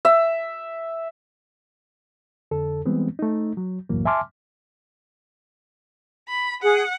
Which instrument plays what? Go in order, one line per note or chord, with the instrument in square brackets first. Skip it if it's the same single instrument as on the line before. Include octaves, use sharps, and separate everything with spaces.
[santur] E5
[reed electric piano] F2 D3 A4
E3 G3 G#3 B3 C4
A3 D#4
F#3
C2 F#2 A2 E3 F#3 A#3
E5 G#5 A5 C6 D6 F6
[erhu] B5
[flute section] G#4 [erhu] F#5